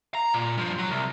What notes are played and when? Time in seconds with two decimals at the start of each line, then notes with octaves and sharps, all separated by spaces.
0.15 A#5
0.34 A#2
0.58 G2 F3
0.79 F#3
0.91 C2